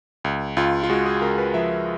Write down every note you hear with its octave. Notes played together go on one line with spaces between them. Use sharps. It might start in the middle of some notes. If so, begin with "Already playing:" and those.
C#2
C#2 F4
F4
G#3 F#4
G#4
C#2 A#4
B4
F3 E5